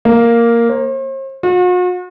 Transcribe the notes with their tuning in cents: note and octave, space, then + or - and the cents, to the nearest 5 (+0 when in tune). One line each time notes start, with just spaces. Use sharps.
A#3 +0
C5 +45
F#4 -45